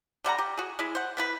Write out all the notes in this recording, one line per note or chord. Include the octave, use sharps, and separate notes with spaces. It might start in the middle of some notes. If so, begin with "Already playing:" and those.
D3 G3 F#5 A#5
G4
F#4 G#4
G#3 E4 G#4
C5 F#5
B3 E4 B4